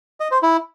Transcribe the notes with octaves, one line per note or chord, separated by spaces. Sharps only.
D#5
C5
E4